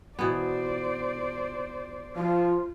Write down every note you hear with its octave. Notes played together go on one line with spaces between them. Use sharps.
B2 E3 B3 C5 D5
F3 F4